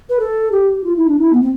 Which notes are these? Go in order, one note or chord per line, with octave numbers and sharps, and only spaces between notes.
B4
A4
G4
F4
E4
D4
E4
B3
C4